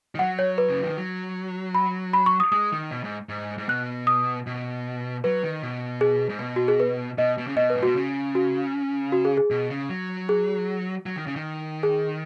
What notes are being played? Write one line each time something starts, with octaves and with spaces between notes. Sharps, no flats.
D#3
F#3 F#5
C#5
B4
C#3
D#3
F#3
B5
B5
C#6
D#6
G#3 D#6
D#3
B2
G#2
G#2
G#2
B2 F#6
D#6
B2
F#3 B4
D#3
B2
G#4
G#2
B2
F#4
G#4
B4
B2 D#5
B2
C#3
B2 D#5
B4
G#2
B2 F#4
C#3
F#4
F#4
G#4
G#4
B2
C#3
F#3
G#4
F#3
D#3
C#3
D#3
G#4